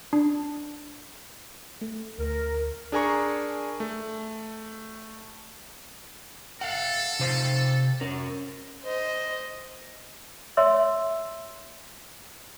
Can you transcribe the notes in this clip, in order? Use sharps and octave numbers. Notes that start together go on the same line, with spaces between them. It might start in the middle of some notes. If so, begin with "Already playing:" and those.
D4
A3
D2 A#4
D4 G#4 A#4 G#5 A#5 C#6
A3
A4 F5 F#5
C3 C5 F5
C#4 A#4
C5 D#5
C#5 E5 C6 E6